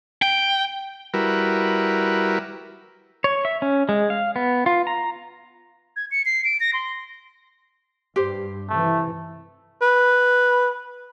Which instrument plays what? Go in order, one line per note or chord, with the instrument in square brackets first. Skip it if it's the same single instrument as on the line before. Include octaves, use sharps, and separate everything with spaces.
[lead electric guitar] G5
[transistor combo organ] G3 E4 F#4 A#4 B4
[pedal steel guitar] C#5
E5
C#4
G#3
F5
B3
F4
A#5
[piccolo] G#6
C#7
C7
D7
A#6
C6
[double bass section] G2 [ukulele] G4 C5
[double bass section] C3 E3 [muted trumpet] A3
[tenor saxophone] B4